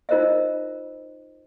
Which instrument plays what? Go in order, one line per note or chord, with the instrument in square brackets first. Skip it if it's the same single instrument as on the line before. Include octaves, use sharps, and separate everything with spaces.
[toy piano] D#4 F4 A#4 C5 D#5 E5